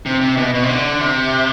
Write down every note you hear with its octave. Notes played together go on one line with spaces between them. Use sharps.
C3
C3
B2
B2
C3
D3
C3